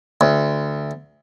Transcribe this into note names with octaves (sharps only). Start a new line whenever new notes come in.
D2